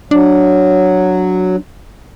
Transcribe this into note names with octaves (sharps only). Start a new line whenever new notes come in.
F#3 D4